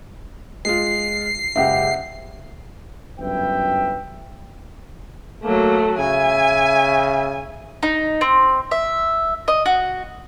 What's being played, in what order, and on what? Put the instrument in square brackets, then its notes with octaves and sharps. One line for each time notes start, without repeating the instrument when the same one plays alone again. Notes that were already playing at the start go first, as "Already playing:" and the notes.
[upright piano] G#3 F4 [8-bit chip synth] C7
[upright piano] F#1 C#2 G4 [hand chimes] E5 F#5
[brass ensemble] G1 F#2 B4 E5 G5
[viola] F#3 A3 [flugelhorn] A#3 [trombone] A4
[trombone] C#3 [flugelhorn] E5 [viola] G#5
[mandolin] D#4
C4
E5
D#5
F#4